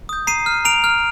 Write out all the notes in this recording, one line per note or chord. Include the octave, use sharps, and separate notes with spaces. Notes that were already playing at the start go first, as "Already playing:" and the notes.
D#6 G6
A#5 C7 D#7
F6
A#5 D7 F7
F6